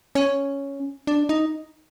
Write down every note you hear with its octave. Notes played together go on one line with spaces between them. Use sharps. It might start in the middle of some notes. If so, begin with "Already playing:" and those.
C#4
D4
D#4